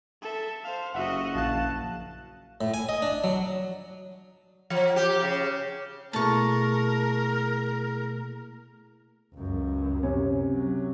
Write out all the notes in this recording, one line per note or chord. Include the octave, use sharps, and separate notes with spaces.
A4 E5
C5 F5
F#1 F#4 D#5 E5 F#5
A#1 F5 A5 F#6
A2
G#5
D#5
D4
F#3
F3
G4
C#3
B2 A3 A#3 E4 G#4 A#4 A5 C#6
C#2 F#2
C3 C#4
F#3